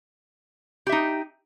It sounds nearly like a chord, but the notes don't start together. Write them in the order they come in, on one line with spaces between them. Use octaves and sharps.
G4 E5 D#4